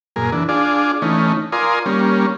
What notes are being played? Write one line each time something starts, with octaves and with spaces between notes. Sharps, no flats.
F#2 A#2 G#4 A#4
E3 D4
D4 F4 G#4 D5
E3 A3 C#4 D#4
F4 A#4 D5 G#5 C6 D#6
G3 A#3 C#4